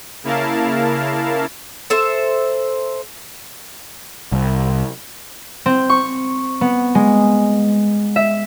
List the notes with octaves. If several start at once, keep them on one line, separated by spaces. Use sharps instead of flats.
C#3 A#3 E4 A#4 F5 A5
A4 C5 E5
C2
C4
C#6
B3
G#3
E5